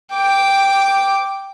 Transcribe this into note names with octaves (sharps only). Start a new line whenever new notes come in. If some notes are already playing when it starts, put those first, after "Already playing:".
G5 D6